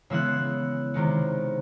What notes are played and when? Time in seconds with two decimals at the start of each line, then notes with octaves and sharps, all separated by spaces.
0.10 C#3 E3 G#3 B3 E6 F#6
0.94 C3 D#3 G#3 B3